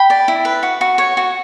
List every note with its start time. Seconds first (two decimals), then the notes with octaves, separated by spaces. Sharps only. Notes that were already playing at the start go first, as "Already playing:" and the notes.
Already playing: G5 B5
0.10 D5
0.28 E4
0.45 B4
0.63 F#4
0.81 F#4
0.98 C#5
1.17 F#4